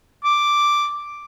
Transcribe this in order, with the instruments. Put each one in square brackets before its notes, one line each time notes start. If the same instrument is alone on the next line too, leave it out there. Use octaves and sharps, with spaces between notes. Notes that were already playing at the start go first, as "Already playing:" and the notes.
[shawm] D6